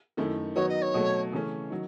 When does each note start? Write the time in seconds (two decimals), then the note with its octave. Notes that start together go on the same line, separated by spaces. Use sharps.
0.17 F#2 D#3 A3 E4
0.55 D#3 F#3 B3 D#4 F#4 C#5
0.69 D#5
0.82 C#5
0.94 B2 F#3 A3
1.32 C#3 E3 A3 C#4
1.71 D#3 F#3